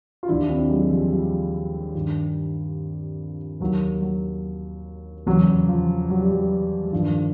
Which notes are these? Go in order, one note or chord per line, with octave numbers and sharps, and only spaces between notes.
F4
D#2 D#3 D4 E4
C4 D4
F#3 G#3
F3 G3
F3 G3
G2 D#3
D#2 D#3 F#3
F#3
E2 C#3 E3 F#3
F3
F#3
G3
F#3
G#3
G2 D#3 F3 G3